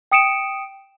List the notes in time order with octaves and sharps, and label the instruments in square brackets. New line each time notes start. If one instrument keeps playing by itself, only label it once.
[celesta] G5 D#6 C#7 D7 E7